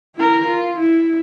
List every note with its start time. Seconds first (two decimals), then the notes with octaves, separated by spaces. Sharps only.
0.15 E4 A#4
0.46 F4
0.78 E4